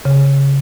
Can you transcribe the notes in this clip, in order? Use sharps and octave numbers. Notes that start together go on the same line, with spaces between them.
C#3